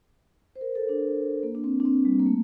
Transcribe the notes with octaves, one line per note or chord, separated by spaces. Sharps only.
C5
A#4
A4
D4
A#3
D4
C4
D4
C4
G3
A#3
A3